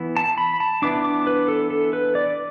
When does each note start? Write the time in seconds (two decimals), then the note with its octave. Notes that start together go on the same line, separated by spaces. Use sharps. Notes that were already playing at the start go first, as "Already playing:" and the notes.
Already playing: E3 B3 E4
0.17 A5
0.38 B5
0.60 A5
0.82 E3 B3 D4 D6
1.04 D6
1.27 B4
1.48 A4
1.71 A4
1.93 B4
2.15 D5